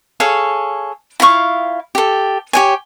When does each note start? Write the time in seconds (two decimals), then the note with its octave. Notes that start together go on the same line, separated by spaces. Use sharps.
0.20 G#4 A4 C#5 F5
1.20 E4 F4 F5 C#6
1.95 G4 A4
2.53 G4 C#5 G#5